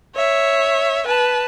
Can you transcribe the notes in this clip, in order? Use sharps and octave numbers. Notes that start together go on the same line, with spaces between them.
C#5 E5
B4 A5